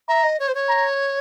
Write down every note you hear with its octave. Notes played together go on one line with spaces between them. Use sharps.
E5 A#5
D#5
C#5
C5
C#5
A#5